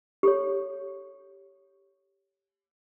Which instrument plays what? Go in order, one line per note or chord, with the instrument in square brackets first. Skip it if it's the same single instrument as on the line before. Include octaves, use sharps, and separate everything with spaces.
[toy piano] G4 A4 C#5